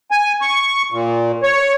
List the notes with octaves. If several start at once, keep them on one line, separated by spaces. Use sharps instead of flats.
G#5
C#6
A#2
C#5